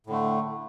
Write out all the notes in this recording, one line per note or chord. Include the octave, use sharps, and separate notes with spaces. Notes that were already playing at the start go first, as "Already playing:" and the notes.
A2 D3 A3